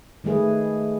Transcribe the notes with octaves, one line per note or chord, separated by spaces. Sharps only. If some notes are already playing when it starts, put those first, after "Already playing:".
D#3 G#3 A3 G#4 B4